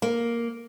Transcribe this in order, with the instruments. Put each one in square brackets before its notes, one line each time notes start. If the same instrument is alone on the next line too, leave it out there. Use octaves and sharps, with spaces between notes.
[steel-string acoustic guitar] A#3